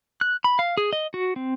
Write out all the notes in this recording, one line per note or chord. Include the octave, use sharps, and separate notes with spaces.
F#6
B5
F5
G#4
D#5
F#4
C4